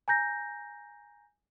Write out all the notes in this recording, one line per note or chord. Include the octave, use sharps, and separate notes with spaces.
G#5 A#5 G6 A#6